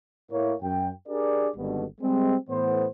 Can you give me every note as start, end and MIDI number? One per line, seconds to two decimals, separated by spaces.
0.30 0.54 45
0.30 0.54 58
0.30 0.54 64
0.30 0.54 73
0.62 0.90 42
0.62 0.90 79
1.08 1.49 62
1.08 1.49 67
1.08 1.49 68
1.08 1.49 70
1.08 1.49 74
1.56 1.84 32
1.56 1.84 43
1.56 1.84 47
1.56 1.84 50
2.01 2.35 55
2.01 2.35 56
2.01 2.35 60
2.49 2.86 45
2.49 2.86 52
2.49 2.86 59
2.49 2.86 72